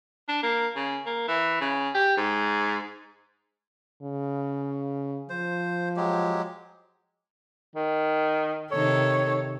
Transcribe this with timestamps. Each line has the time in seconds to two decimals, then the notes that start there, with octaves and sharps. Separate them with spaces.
0.29 D4
0.43 A#3
0.76 C#3
1.06 A#3
1.28 E3
1.61 C#3
1.95 G4
2.17 G#2
4.02 C#3
5.30 F3 C5
5.97 F#3 G#3 G4
7.76 D#3
8.72 C3 D#3 A4 C#5